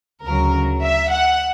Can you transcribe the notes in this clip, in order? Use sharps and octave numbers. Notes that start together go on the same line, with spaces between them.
D2 C#3 F#3 A#4
E5
F#5